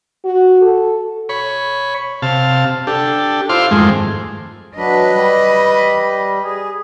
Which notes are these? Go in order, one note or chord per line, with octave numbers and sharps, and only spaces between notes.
F#4
A4
C#5 B5
C3 F5 A5
D4 G4 A4
E4 F4 C5 F5 C6 D6
F2 G#2 D#3 G#3 A3 C4
F#3 D4 B4 D#5
G3
G#4